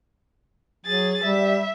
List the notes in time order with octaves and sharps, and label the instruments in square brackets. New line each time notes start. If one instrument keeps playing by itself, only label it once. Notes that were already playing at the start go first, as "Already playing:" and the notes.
[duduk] F#3 [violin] G#4 A6
[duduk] G3 [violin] E5